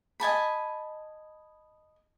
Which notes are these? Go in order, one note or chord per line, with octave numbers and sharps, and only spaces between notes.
D#5 G#5 A5 B5